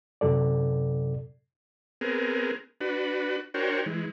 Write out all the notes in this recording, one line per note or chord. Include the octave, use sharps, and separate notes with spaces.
F#2 C3 F#3 A4 D5
B3 C4 G#4 A#4
D4 F#4 B4
D4 F#4 A#4 C5 C#5 G5
E3 G#3